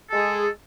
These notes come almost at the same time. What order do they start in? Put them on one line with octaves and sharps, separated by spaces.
A4 G#3 G#4